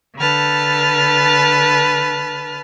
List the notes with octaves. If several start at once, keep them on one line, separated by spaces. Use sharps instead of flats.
D3 B4 A5 F6